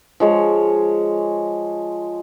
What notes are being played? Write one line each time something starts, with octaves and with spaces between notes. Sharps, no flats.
F3 G#3 C#5